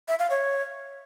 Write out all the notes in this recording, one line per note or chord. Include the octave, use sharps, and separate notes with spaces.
E5
F5
C#5